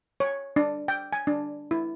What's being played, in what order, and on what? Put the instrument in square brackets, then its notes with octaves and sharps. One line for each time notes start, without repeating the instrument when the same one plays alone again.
[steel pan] C#5
D4
G5
G#5
D4
E4